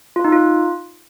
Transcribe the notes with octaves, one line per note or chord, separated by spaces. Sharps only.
F4
D#4
F4